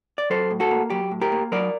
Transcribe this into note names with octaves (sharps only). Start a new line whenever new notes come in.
D5
F#3 A4 C5
A2
F#4 A4
A#3
F#3 G4
A2
G4 A#4
A#3
F#3 A#4 D5